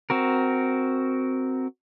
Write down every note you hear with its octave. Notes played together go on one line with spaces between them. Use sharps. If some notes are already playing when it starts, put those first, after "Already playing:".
C4 F#4 A#4